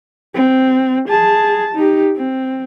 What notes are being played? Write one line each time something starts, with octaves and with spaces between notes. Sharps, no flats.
C4
G#4 A5
D#4 G4
C4